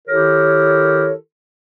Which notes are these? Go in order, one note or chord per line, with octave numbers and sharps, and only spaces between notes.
D#3 E4 G4 A4 A#4 C#5